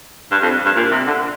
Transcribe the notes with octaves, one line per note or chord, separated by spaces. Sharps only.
G2
F2
G2
A#2
C3
D3